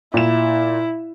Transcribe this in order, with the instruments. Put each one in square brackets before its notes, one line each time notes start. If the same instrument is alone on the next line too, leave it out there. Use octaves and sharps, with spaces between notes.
[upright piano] A#2 E7 [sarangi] E4